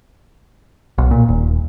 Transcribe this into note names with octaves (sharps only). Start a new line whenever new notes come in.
B1
A#2
D#1